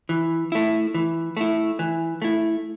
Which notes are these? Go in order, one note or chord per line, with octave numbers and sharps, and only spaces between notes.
E3
A3 E4
E3
A3 E4
E3
A3 E4